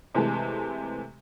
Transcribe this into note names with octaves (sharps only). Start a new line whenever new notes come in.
C3 E3 G#3 A3